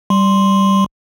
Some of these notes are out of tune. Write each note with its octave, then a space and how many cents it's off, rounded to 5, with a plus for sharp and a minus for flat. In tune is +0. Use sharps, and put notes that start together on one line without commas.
G3 -10 C6 +0